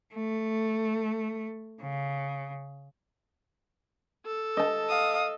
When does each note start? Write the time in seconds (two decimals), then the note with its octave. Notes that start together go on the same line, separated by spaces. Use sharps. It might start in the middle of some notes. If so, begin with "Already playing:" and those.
0.15 A3
1.81 C#3
4.26 A4
4.57 D#5 A5
4.89 F5 D#6